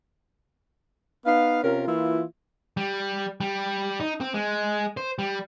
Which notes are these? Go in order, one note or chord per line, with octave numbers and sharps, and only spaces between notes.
B3 D#4 F5
C3 C#4 F4 A#4
E3 A#3 E4 F4
G3
G3
D#4
C4
G#3
C5
G3